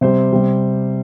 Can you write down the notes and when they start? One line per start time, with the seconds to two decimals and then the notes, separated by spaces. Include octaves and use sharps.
0.01 C3 G3 C5
0.32 C3 G3